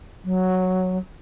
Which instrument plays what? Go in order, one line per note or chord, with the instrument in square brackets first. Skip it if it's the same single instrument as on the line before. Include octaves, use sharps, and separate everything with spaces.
[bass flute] F#3